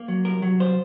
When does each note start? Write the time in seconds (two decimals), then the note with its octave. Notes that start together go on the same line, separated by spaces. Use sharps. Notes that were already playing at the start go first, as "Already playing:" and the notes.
Already playing: A#3
0.08 F#3
0.25 C2 A#4
0.42 F#3
0.59 C2 C5